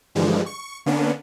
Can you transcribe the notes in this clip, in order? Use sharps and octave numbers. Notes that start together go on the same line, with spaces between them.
G2 D3 E3 F3 G3 G#3
C#6
D3 A#3 B3 C#4 D4